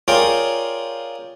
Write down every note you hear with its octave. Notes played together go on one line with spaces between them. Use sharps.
F4 G#4 A#4 C#5 D5 G5